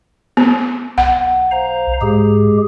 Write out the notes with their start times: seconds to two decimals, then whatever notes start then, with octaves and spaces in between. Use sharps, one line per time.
0.37 B3
0.98 B1 F#5
1.51 C5 F5 A#5
2.01 G#2 G#3 G4 G#4